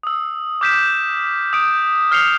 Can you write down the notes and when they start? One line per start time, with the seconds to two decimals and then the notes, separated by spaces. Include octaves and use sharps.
0.03 D#6 E6
0.61 D6 F6 G6 B6 D7 E7
1.53 D#6 G6 D7
2.11 F6 G6 C7 C#7 F7 G7